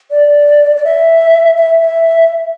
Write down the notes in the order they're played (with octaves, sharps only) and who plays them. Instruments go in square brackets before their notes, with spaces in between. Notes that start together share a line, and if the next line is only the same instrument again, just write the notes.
[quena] D5
D5
E5
E5
E5